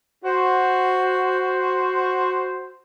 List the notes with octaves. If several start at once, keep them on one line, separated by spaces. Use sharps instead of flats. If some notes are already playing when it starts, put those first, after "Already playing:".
F#4 C5